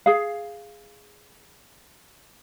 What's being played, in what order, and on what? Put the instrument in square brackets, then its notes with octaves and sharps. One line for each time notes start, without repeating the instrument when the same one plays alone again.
[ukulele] G#4 F5